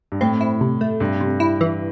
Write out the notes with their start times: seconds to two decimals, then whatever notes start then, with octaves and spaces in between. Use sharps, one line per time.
0.12 G2
0.21 A2 C4
0.41 E4
0.61 C3
0.81 A3
1.00 G2 C3
1.21 C3
1.40 E4
1.61 E3